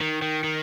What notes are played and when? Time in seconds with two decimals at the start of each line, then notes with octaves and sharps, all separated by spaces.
0.01 D#3
0.22 D#3
0.44 D#3